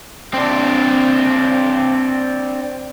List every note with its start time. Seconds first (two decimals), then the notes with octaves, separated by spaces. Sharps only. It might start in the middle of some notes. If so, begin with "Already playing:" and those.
0.34 C4 D4